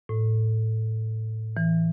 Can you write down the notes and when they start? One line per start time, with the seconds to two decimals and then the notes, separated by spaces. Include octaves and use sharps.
0.09 A2
1.57 E3